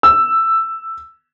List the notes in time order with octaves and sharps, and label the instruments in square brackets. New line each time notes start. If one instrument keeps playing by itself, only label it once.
[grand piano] E6